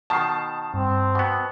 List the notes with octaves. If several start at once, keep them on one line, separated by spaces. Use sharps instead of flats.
B2 D#3 A5 C7
G2 C4
B2 B3